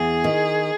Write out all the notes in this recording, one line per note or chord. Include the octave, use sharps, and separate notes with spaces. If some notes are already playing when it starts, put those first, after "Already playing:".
Already playing: E2 G#4
D#3